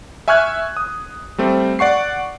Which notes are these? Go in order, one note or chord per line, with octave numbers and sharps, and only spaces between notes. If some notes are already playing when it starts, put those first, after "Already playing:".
E5 G#5 C#6 F6 F#6 G#6
D#6
G3 A3 C4
D5 F#5 C#6 C7